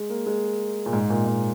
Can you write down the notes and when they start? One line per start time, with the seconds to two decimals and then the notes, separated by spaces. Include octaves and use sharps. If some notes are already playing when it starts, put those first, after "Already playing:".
Already playing: G#3
0.10 A#3
0.26 G#3
0.86 A#2
0.93 G#2
1.10 A#2
1.27 G#2